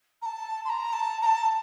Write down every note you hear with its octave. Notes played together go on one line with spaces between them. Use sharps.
A#5
A5
C6
A#5
A5
A#5
A5